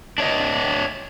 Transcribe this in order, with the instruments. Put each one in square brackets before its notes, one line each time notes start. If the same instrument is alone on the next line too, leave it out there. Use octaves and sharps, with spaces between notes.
[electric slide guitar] D4 C#5 D#5